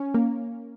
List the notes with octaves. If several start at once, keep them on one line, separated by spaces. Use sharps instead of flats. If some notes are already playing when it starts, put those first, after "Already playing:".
Already playing: C#4
A#3